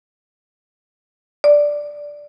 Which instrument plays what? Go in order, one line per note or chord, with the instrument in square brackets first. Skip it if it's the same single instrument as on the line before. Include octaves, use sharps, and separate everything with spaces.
[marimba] D5